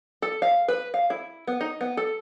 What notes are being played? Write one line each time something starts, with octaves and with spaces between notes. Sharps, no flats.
A4
F5
B4
F5
E4
B3
D#4
B3
A4